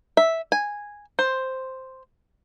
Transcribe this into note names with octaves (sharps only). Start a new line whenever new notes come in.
E5
G#5
C5